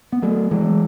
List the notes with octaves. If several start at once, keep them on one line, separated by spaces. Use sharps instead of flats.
B3
F#3 A3
E3 G#3